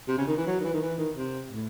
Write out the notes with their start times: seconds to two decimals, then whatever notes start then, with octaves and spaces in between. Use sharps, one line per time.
0.08 C3
0.18 C#3
0.27 D#3
0.37 E3
0.47 F#3
0.60 D#3
0.64 E3
0.73 D#3
0.82 E3
0.98 D#3
1.16 C3
1.51 A2